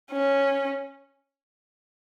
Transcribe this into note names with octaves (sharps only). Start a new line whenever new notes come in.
C#4